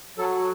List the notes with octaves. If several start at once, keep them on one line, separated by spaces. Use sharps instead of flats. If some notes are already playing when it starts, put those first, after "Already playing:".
F#3 A4